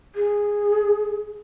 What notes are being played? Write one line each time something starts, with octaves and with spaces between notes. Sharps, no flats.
G#4